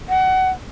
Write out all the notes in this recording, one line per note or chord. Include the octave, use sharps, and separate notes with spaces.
F#5